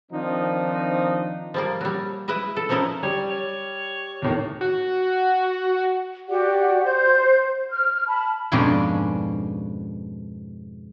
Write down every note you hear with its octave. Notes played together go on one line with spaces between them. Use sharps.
D#3 F3 C4 D4 D#4
F3 G3 A#3
F#3 G3
E4 B4 D#5 E5
A4
F3 A#3 C#4 D#4 E4
G3 C#5
C#5
E2 A2 D#3
F#4
F#4 G4 D5 F#5
C5 G6
F6
A5 B5
F2 G#2 B2 C#4 D4